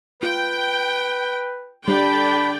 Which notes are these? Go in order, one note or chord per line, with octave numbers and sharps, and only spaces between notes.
F4 B4 G5
D3 G3 D4 D5 G5 B5